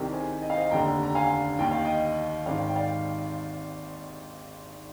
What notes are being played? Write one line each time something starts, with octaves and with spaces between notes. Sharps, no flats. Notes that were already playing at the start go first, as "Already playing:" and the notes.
Already playing: C2 C3 D#3 G4 A#4
G#4 C5
D#5
F5
C5 D#5
F1 D#2 D3 G5 A#5
A#5
F5 G#5
D#2 D#3 G5
F5
D#5 G5
G#1 G#2 D#3 D5 F5
G5
D5 F5